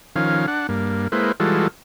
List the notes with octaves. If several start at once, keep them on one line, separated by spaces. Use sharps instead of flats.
D#3 F3 C#4 F5
D4 F#5
G2 A#3
G#3 A#3 E4 B4 C5
E3 G3 G#3 F4 F#4 A4